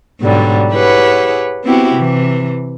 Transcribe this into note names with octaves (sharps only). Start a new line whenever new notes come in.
G#2 B2 D3 F#3 G3
E4 G4 G#4 B4 C#5 F#5
B3 C4 E4 F#4 G4
C3 E3